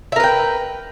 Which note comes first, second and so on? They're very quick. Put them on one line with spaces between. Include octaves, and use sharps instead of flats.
E5 A#4 B4 G5